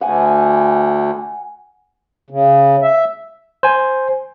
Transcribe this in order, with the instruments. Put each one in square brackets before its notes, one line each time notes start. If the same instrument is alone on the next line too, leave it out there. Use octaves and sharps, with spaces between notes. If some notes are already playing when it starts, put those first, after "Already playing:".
[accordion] D2 [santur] F#5 G#5 D#6
[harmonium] C#3
E5
[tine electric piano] C5 G#5